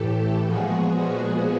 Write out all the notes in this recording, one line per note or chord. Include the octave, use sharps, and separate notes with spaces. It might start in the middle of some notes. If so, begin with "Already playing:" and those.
Already playing: A2 E3 A3 G4 A4
A#2 F3 G#3 B3 F#4 G#4